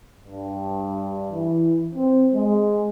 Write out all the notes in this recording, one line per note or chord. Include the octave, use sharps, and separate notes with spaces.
G2
E3
C4
G#3